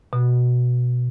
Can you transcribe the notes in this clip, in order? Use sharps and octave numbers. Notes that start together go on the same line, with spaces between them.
B2